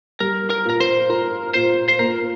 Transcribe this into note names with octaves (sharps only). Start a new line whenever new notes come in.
G3 A#4
A#4
A#2 A#4
C5
F4 A#4
A#2 C5
C5
A#3 A#4